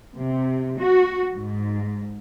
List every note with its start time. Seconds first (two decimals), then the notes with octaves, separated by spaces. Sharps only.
0.17 C3
0.80 F#4
1.35 G#2